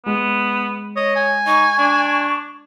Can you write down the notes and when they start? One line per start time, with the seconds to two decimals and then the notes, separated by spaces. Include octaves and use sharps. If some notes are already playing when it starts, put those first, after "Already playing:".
0.06 G#3 B3
0.96 C#5 D#5
1.16 G#5
1.47 D#4 C#6
1.79 D4